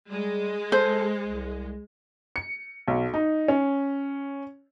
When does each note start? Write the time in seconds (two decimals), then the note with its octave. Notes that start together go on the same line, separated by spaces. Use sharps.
0.10 G3 G#3
0.72 A4 C5
1.26 C2
2.36 C#7
2.88 B1
3.14 D#4
3.48 C#4